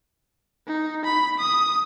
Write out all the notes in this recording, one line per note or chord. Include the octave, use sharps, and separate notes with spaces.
D#4
B5
D#6